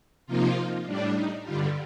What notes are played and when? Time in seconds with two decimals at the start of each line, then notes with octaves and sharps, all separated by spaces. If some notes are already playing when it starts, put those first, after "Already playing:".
0.26 C3 F3 A#3 D#4 F4
0.86 A2 G3 D4
1.15 D#4
1.44 G2 D3 G3 F4